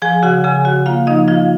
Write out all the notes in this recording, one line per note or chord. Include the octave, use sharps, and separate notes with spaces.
F3 G#4 G#5
C#3 F#4 F#5
C#3 G#4 G#5
C#3 F#4 F#5
A#3 F4 F5
F3 D#4 D#5
F3 F4 F5